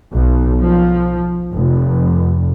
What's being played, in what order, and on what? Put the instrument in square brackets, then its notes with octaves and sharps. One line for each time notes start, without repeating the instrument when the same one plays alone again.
[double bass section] B1
F3
F1